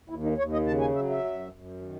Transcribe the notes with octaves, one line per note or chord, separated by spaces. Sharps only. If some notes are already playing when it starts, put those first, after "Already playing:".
D#2 E4
D#4
D#2 C#5
D#5
C#3 A5
G#5
F#3 E5
E5
F#2
F#2
D#3